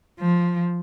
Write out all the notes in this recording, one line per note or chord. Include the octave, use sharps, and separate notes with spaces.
F3